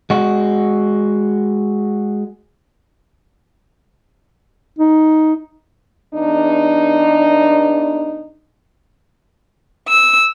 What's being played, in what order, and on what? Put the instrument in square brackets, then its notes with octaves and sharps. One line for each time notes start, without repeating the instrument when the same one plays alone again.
[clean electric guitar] G#3 F#4
[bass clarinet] D#4
[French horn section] E2 D4 D#4
[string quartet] E6